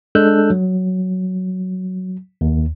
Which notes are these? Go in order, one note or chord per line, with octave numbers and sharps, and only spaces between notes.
G#3 D4 A4 E6 F#6 G6
F#3
D#2